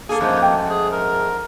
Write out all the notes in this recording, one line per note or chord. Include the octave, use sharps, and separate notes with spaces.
A#3 G#4 A4
F2 G#2 A3
G5
G#4
A#4